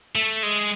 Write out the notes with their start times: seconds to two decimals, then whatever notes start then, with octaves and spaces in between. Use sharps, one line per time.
0.15 A3
0.43 G#3